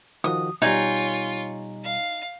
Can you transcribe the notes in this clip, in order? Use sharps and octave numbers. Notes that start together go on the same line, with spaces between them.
D#3 F3 F#4 D#6
B2 G3 D#4 F4 C#5 G#5
F5